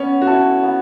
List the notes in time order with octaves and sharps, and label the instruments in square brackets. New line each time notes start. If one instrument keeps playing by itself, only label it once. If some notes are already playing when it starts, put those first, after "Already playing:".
Already playing: [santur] B3 [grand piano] C#4
[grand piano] F#4
[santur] E4 C#5 [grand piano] A4
[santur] B3